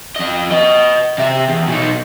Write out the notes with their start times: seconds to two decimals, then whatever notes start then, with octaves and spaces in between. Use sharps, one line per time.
0.16 F2 D#5
0.51 B4 D#5
1.18 C3 E5
1.50 E2
1.68 B2 D#4